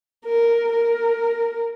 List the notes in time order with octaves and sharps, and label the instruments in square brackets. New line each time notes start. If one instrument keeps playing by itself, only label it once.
[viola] A#4
A#4